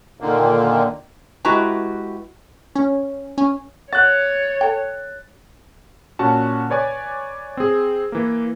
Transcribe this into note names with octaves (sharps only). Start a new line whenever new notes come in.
A#2 D3 D#3 A#3
G#3 E4 F#4 G4 B4 A#5
C#4
C#4
F#4 C#5 F#6 A6
A4 G5
A#2 C#4 F#4 A5
B4 C#5 D5 G#5 D6
C4 G#4
E3 A#3